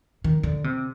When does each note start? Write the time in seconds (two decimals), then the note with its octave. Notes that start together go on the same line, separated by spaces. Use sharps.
0.24 D#3
0.43 D3
0.64 C3